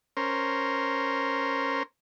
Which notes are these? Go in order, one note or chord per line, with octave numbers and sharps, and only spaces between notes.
C#4 A#4 C5